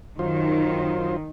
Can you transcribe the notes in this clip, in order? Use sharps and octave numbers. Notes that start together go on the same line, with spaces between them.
F#2 D#3 F4 C5